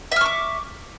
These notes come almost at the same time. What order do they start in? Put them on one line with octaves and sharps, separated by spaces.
E5 F6 C#6 D6